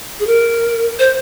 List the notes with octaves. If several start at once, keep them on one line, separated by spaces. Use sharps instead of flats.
G#4
A#4
C5